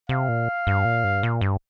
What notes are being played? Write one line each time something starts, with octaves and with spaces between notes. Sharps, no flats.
C3 F5
A#2
G2
A#2
G2
A#2
G2